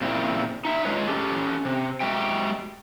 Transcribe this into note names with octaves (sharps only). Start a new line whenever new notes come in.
A#2 C#3 C4 E4
D#4 E5
G#3 F4 G#4 B4 C#5
C#4 G4 A4
C3
G#3 F#4 G4 E5 G5